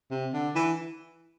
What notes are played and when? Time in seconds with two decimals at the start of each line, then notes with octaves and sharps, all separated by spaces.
0.11 C3
0.33 D3
0.55 E3